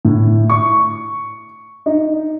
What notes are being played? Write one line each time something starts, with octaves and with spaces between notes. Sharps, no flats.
A2
C#6
D#4